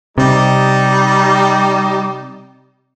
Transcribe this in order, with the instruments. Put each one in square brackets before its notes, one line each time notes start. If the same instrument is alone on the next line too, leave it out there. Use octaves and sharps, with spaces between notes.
[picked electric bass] C3 [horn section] G3 D#4